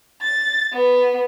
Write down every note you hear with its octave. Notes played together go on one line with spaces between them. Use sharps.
A6
B3